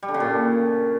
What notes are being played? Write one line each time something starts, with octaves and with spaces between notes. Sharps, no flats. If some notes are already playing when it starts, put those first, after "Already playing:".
G3
D3
C#3
A#2